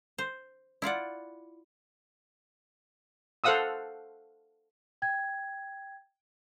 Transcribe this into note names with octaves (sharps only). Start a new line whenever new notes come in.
C5
E4 F4 D5 F#5
A4 C5 F5 F#5 D#6 E6
G5 G#6